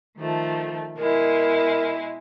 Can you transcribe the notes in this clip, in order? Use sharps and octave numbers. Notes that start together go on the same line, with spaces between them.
D#3 F3 A3
B2 G#3 E4 A#4